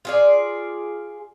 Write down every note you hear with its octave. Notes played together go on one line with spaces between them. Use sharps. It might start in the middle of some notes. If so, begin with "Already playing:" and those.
F4 G#4 D5